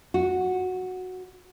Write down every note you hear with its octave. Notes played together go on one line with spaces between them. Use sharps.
F#4